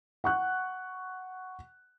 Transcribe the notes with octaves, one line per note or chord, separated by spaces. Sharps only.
F#5 C#6 F#6